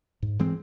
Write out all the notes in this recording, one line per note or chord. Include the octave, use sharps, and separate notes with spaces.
G#2
E3 G#3 C4